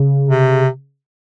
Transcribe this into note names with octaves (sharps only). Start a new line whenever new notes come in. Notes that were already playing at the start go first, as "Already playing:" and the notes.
Already playing: C#3
C3